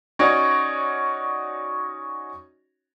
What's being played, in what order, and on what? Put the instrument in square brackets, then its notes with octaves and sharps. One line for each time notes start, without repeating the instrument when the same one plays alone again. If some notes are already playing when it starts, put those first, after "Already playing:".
[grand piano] C#4 D#4 F#4 C#5 D5